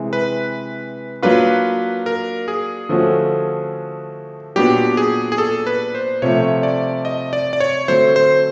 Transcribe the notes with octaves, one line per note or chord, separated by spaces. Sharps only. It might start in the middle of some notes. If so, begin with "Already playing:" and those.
Already playing: C3 E3 G#3
B4
F#3 A#3 D4 F4 B4
A#4
G#4
D3 F3 A3 C#4 F#4
A#2 F#3 B3 D4 F#4 G4
G#4
G#4
A4
B4
C5
C3 F3 A3 C#5
D5
D#5
D5
D5
C#5
D3 F#3 A3 C4 C5
C5